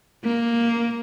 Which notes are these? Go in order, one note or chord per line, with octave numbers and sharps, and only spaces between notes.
A#3